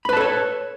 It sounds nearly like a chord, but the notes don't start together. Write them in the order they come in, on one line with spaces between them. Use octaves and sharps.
B5 B4 A5 A4 C#5